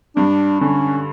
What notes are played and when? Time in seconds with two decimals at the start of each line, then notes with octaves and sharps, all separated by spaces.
0.16 G2 D4
0.61 D3 C#4